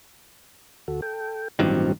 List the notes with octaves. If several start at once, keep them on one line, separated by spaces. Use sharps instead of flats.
D2 F#4 A4
A4 G5
A1 G2 D#3 E3 F#3 C4